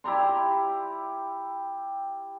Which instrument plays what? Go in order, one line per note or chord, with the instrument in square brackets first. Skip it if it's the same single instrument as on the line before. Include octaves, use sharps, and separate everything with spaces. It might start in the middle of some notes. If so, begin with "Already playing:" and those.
[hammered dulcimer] E4 G4 A#5 C6